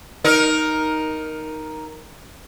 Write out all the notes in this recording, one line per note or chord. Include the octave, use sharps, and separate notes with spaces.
D#4 A#4